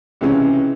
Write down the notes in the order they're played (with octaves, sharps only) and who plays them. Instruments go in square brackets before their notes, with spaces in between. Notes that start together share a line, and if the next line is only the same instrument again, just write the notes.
[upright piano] C#2 C3 E3 G#3 C#4